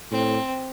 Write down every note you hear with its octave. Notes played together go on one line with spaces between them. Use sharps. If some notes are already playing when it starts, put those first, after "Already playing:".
A2 C4